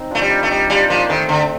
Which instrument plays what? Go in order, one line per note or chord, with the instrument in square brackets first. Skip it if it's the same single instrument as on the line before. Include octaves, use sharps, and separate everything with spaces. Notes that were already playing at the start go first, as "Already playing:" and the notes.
Already playing: [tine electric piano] C4 D#4
[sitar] A3 [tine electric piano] D4 F4
[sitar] G3
[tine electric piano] D#4 G4
[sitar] A3
[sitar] G3 [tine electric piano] D#4 G4
[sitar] G3 [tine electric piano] D4 F4
[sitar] F3 [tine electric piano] A#3 D4
[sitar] D#3 [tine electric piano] A3 C4
[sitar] D3